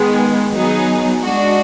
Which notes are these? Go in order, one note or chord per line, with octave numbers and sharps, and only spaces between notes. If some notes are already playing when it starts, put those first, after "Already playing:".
Already playing: D#3 G#3 B3
F#3 B3 D#4 G#4
G#3 D4 F#4